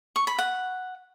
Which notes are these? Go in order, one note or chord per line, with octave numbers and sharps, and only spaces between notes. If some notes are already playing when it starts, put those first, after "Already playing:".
C#6
B5
F#5